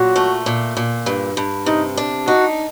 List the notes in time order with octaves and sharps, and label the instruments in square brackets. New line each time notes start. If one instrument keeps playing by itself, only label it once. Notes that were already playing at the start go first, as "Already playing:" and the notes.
Already playing: [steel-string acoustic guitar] A#2 F#3 [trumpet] F#4
[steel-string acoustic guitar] A3
A#2
A#2
G2
G2
[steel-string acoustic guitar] C3 [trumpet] D#4
[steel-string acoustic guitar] D4
[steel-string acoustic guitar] D#4 [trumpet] F#4